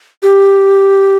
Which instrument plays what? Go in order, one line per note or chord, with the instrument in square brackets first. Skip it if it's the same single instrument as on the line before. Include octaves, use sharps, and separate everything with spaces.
[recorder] G4